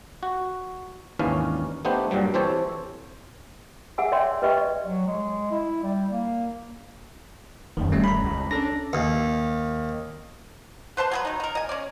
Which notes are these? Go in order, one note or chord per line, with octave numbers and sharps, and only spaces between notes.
F#4
G#1 D#2 E3 C#4 D4 F5
A3 B3 D4 D#4 G4 C5
G2 A#2 F#3 G3
E3 C4 G4 A4 C5 C#5
G#4 E5 F#5 G#5 E6
C#5 D5 E5 G5 C6
G4 B4 D#5 E5 G5 C#6
D5
F#3
G#3
E4
G3
A#3
D#1 F#2 D#3
G3 A3 C#4
A#5 B5
C#2
C#4 D4 A4 A#6
D#2
B4 C5 A5 C6
F#3 G#4 B4
D#3 D#4
D#4 A#4
D#5 G#5
C#4 D5